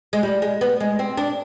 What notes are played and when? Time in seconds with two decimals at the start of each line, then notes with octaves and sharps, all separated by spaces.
0.13 G#3
0.23 G3
0.42 G#3
0.61 B3
0.80 G#3
0.99 C4
1.17 D4